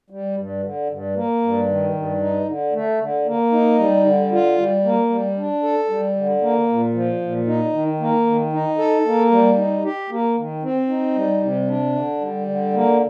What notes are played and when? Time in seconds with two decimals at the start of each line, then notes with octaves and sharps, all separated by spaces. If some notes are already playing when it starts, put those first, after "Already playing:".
0.10 G3
0.36 G2
0.63 D3
0.89 G2
1.15 A#3
1.42 G2
1.68 D#3
1.94 G2
2.20 D#4
2.47 D3
2.73 A3
3.00 D3
3.26 A#3
3.52 D#4
3.79 G3
4.05 D3
4.32 F4
4.57 G3
4.84 A#3
5.10 G3
5.37 D4
5.63 A4
5.89 G3
6.16 D3
6.42 A#3
6.69 A#2
6.94 F3
7.21 A#2
7.47 D#4
7.73 D#3
8.00 A#3
8.27 D#3
8.53 D#4
8.78 A4
9.05 A#3
9.31 G3
9.57 D#4
9.84 G4
10.10 A#3
10.37 D#3
10.63 C4
10.89 D#4
11.15 G3
11.42 C3
11.68 D4
11.95 D3
12.21 G3
12.48 D3
12.74 A#3